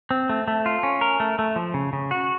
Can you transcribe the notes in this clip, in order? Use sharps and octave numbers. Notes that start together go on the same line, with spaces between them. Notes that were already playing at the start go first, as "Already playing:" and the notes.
C4
A3
A3
F4
C#4
A#4
A3
A3
F3
C#3
C#3
F#4